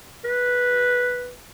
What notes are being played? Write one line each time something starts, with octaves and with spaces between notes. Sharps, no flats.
B4